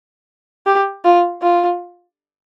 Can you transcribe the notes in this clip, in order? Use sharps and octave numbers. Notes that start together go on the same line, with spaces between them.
G4
F4
F4